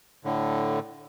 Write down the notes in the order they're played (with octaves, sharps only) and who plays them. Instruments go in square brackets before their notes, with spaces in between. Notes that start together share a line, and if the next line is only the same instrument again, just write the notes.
[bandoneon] A2 D3